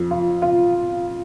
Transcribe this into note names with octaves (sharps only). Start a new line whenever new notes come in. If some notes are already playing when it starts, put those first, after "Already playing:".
Already playing: F2
F4
F4